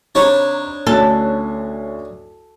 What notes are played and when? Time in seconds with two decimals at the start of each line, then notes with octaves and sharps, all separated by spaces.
0.15 C3 D4 D#4 C#5 A#5 B5
0.87 D2 C#4 A4 F#6